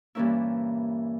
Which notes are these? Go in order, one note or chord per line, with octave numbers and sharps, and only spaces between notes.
G2 A#2 E3 A#3 C#4 E4